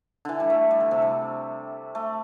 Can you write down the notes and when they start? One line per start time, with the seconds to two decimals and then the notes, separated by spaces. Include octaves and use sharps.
0.25 D3 E3
0.40 G3
0.50 A3
0.71 G3
0.80 D3
0.91 C3
1.02 G3
1.95 A3